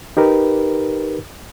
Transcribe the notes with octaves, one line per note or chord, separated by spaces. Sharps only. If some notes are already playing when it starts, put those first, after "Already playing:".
D#4 G4 A#4 B4